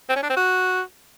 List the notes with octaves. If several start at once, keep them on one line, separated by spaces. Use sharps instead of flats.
C4
C#4
D4
C4
F#4